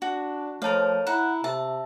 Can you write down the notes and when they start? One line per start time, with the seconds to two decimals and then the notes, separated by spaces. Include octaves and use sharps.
0.02 D4 F#4
0.62 F3 A3 A#4 C#5 F5 A5
1.07 E4 F#5 A#5
1.44 C3 E5 A5